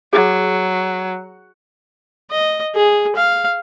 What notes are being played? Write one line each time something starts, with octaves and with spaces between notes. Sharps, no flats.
F#3 G#4
D#5
G#4
F5